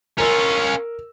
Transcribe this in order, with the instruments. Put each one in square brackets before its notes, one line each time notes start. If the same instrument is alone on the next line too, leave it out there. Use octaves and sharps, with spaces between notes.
[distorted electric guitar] C#4 F4 [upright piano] A#4 E6